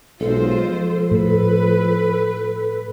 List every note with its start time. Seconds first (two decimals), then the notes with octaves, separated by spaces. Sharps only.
0.20 B1 G#3 F4 A4 C5
0.66 F3
1.11 A2 B4